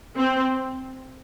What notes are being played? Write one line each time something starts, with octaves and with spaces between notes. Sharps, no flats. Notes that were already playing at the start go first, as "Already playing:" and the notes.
C4